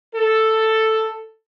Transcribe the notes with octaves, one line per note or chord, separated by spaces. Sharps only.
A4